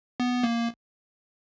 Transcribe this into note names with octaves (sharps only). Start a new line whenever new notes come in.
B3
A#3